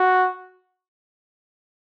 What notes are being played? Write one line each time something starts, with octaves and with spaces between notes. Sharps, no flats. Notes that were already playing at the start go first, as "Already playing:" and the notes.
Already playing: F#4